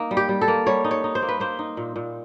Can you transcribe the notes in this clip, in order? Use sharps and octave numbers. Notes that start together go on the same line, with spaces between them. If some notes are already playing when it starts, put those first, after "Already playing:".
Already playing: A#3 D#4
G3
G4
G3
A4
A#3
G3 C#5
D#4
C#5
D#4
C5
A#3
B4
A#3 C5
D#4
A#2
A#2